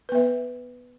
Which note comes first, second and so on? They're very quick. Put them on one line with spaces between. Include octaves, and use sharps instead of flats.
B4 B3 E5